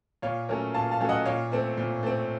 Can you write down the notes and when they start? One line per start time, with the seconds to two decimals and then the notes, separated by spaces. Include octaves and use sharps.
0.22 A#2 C#5 F5
0.49 F#3 A3 C#4 A#4 C#5
0.74 A#2 F5 A5
0.91 F5 A5
1.00 F#3 A3 C#4
1.09 D#5 F#5
1.26 A#2 C#5 F5
1.52 A3 C4
1.77 A#2
2.03 A3 C4